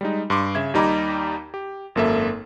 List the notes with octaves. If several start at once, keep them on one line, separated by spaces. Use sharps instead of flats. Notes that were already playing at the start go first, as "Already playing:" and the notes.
G3 G#3 D#4
G2 C6 D6
C#3 E5 G#6
D#2 G3 D#4 A#5 B5 D6
G4
G#1 F#2 A#3 A4 E5